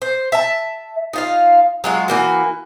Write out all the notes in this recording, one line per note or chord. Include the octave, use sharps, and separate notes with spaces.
C5
E5 A5
D#4 F4 F5
F#3 G#3 F4
E3 A#3 F#4